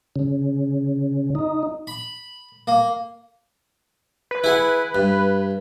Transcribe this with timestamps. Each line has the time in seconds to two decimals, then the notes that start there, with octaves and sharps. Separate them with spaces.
0.16 C#3
1.35 D#4
1.87 B5
2.67 A#3
4.31 B4
4.44 E4 G#4 F#5
4.95 G2